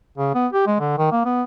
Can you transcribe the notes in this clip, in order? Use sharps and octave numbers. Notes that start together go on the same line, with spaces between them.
C#3
B3
G4
G#3
D3
D#3
A#3
B3